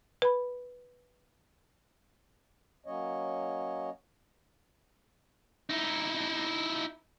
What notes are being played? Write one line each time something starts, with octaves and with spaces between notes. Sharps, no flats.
B4 B5
F#3 A#3 C#4 C#5 D#5
D#4 E4